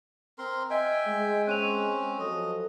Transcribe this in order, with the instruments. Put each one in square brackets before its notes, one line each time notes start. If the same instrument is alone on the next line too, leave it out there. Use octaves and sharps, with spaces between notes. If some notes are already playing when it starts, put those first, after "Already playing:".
[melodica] C4 A#4 C6
[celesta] D#5 [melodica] E5 G5 G#5
[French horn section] G#3
[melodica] C4 C#4 [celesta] F#6 D#7 F7
[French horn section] F3 F#3 A4 [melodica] D#5